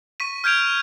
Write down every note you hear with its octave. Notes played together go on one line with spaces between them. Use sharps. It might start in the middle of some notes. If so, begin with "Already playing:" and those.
C#6 B6 D#7
F6 G6 G#6 D7 F7